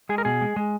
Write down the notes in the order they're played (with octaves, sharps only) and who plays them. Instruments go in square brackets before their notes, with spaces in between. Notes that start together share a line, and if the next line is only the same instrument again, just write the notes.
[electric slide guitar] G#3 G#4
A#4
B2 G#4
G#3
G#3